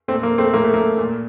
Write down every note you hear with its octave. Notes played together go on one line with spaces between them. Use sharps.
A#2 A3 C4
A#3
A3 C4
A2 A#3
A3
A#3
A#2